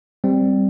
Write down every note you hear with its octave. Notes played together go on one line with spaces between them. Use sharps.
G3 C4